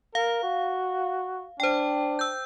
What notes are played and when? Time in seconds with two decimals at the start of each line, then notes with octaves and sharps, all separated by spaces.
0.15 A#4 F5
0.43 F#4
1.60 D4 C5 G5
2.19 E6 G6